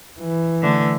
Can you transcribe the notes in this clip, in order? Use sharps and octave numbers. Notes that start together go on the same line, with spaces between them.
E3
D3 A3